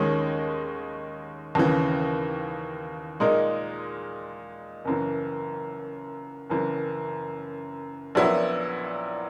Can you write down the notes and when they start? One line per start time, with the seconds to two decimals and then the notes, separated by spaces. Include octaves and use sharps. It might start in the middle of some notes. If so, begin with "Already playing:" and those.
Already playing: D#2 D#3 G#3 C#4
1.55 D#2 C#3 E3
3.20 A#2 G#3 D#4 A#4
4.85 F#1 F#2 E3
6.50 F#1 F#2 E3
8.15 A#1 A#2 F#3 B3 E4